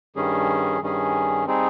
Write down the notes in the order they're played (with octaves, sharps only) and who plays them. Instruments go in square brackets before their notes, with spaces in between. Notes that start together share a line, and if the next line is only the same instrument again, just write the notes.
[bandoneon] G2 D#3 G3 C#4 G#4
G2 D#3 G3 C#4 G#4
G3 C4 D#4 G#4